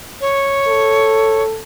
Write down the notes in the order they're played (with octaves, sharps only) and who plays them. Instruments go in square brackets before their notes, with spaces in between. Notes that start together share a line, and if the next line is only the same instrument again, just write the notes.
[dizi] C#5
[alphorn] A4